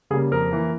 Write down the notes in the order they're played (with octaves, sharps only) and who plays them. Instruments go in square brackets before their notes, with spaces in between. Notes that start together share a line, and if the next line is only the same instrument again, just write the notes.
[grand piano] C#3 G3 A#3 G#4
F2 A#4
E3 A#3